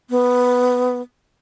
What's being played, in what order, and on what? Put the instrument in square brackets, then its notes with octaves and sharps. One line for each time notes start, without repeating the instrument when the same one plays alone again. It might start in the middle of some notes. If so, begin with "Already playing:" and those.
[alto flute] B3